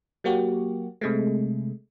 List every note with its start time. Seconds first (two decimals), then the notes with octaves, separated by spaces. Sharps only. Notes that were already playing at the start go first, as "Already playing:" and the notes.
0.24 F#3 A#3 F#4 G4
1.01 C3 G#3 A3